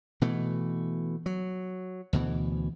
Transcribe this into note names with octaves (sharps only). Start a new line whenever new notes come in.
B2 E3 A3
F#3
D2 B2 E3